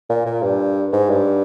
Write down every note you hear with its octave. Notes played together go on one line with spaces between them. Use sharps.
A#2
A#2
G2
G#2
G2